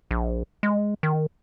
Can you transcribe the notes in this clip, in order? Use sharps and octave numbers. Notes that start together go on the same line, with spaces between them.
A#1
G#3
D#3